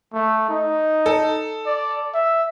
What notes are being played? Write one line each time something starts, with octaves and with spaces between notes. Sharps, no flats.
A3
D#4
A4
D5
E5